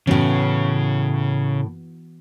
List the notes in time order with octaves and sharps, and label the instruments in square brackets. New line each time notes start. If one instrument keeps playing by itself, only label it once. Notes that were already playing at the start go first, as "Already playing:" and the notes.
[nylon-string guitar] A2 C#4 [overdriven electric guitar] C#3 [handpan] E3 B3 F#4